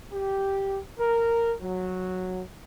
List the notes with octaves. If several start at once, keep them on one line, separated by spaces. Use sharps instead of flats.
G4
A#4
F#3